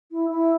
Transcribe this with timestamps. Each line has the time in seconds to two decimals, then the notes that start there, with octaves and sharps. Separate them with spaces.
0.12 E4
0.30 E4